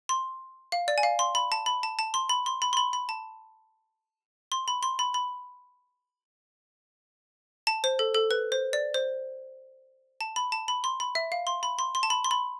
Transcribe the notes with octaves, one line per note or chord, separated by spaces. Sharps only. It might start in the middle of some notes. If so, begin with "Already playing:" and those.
C6
F5
D5
G#5
F5
C6
B5
A5
B5
A5
A5
C6
B5
C6
B5
C6
B5
B5
A5
C6
B5
C6
B5
B5
A5
C5
A4
A4
B4
C5
D5
C5
A5
B5
A5
B5
C6
B5
E5
F5
C6
B5
C6
C6
A5
B5
C6
B5